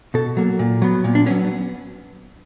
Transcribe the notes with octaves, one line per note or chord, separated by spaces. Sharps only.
B2 A4
F#3 A#3
A#2
F#3 B3
A#2
D4
F#3 B3 C#4